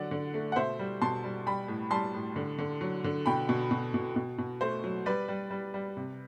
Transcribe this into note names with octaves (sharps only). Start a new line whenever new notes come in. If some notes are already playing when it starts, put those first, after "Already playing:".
Already playing: D3 F#3 D5 F#5
D3
A3
F#5
B2 C5 E5
G3
B2 A5 C6
G3
G3 G5 B5
A2
G3 A5 C6
A2
D3
D3
F#3
D3
B2 G5 B5
B2
B2
B2
B2
B2
A3 C5
F#3
G3 B4 D5
G3
G3
G3
C3